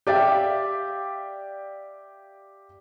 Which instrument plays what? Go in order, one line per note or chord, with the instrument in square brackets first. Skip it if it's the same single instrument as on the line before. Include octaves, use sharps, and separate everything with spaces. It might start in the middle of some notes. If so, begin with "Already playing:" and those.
[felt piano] G4 D5 E5 F5 G5